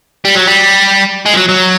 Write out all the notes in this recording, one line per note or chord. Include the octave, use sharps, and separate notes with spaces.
G3
F#3
G3
G#3
F3
F#3
F#3